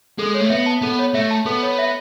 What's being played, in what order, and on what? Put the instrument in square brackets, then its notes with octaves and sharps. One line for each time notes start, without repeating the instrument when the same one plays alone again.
[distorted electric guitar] G#3 [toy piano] A4
[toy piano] C#5
[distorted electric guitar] A3
[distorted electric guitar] B3 [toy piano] E5
[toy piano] A5
[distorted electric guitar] B3 [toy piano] A4
[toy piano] C#5
[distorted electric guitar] A3 [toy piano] E5
[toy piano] A5
[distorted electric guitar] B3 [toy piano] A4
[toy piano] C#5
E5